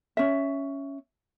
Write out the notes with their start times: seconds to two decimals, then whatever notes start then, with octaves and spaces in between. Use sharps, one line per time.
0.17 C#4 E5